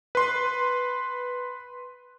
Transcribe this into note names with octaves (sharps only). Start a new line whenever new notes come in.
B4 C6